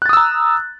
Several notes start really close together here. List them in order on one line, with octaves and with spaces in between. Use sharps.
F#6 A6 D#6 E6 A#5